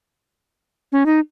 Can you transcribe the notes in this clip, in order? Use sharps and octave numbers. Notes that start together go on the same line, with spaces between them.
C#4
D#4